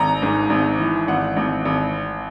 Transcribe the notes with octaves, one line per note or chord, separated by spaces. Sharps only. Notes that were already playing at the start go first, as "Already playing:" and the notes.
Already playing: G#1 A#5
G#2
G#1
E3
G#1 F#5
G#1
G#1